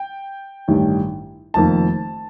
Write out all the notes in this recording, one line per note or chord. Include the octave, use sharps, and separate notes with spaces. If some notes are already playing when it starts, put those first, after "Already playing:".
Already playing: G5
A1 G2 D#3 G3
F1 F2 D#3 A#3 A5